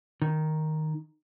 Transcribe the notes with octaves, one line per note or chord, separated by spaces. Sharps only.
D#3